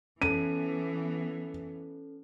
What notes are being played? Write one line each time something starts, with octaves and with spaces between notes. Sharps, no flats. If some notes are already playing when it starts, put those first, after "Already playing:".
E3 B3 C#4 A4 D#7